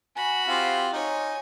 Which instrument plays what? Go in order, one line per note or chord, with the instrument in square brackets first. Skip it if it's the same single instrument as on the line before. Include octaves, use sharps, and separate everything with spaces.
[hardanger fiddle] F#4 B5 [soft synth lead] G#5
[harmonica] C4 F4 G4 [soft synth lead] F5
[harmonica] D#4 [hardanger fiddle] C#5 G#5